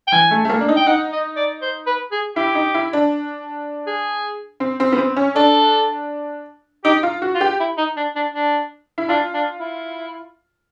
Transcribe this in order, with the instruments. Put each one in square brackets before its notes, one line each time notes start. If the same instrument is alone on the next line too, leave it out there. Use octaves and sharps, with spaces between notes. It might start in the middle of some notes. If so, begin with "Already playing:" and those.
[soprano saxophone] G5
[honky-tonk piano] E3 [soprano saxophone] G#5
[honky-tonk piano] A3
A3
A#3
D4
D#4
[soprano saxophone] G5
[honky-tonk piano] D#4 [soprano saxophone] F#5
[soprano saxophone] D#5
D5
C5
B4
G#4
[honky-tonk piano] E4 [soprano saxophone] G4
[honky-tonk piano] D#4
E4
D4
[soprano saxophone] G#4
[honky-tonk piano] C4
C4
B3
C4
C#4
[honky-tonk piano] D4 [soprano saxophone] A4
[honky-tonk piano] D#4 [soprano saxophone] G4
[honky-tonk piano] F4
F#4
[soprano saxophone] F4
[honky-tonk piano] G4
[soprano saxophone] E4
D#4
D4
D4
D4
[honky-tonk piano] E4
[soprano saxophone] D4 [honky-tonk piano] F4
[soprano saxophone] D4
E4